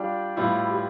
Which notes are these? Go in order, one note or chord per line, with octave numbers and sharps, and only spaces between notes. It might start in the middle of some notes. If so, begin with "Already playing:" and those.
Already playing: G3 D4 F4 G4 D5
A2 G3 B3 E4 F4
G4